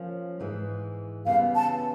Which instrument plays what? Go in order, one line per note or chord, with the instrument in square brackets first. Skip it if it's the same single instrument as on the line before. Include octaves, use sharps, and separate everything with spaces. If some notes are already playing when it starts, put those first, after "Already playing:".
Already playing: [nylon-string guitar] F3 A#3 C#4
G#2 E3 G#3
[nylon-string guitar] C#3 E3 G3 B3 [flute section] F5
[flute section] A5